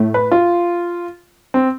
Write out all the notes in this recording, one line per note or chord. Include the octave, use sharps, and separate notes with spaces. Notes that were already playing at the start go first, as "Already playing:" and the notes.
Already playing: A2 A3
B4
F4
C4